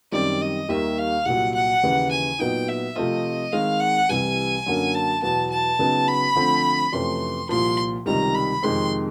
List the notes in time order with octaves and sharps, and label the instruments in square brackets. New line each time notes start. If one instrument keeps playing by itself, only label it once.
[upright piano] F#2 D#3 G3 C4 [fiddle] D5
[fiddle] D#5
[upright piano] D#2 D#3 G3 A#3 [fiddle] E5
[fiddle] F5
[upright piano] C2 A#2 F#3 [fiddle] F#5
[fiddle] F#5
[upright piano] D#2 C#3 E3
[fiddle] G#5
[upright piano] A#2 F#3 B3 D#4 [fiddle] G5
[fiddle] E5
[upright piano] C3 F3 A3 C4 F4 [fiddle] D#5
[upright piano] D#3 G#3 C4 [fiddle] F5
[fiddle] F#5
[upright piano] C2 C3 E3 G3 [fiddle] G#5
[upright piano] F#2 D3 F#3 A#3
[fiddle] A5
[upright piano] E2 B2 F#3 B3 [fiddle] A5
[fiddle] A5
[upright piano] C#3 F#3 B3 D#4
[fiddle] B5
[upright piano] D3 F3 A3 C4
[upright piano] F2 C3 E3 A3 C#4 [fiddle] C6
[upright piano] C2 A#2 F3 [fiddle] C6
[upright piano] C#2 C3 D#3 G3 [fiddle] A#5
[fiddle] B5
[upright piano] F2 C3 D#3 G#3 C4 [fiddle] C6